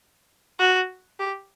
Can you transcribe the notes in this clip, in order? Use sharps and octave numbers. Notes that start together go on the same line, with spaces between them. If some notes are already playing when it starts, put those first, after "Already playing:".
F#4
G4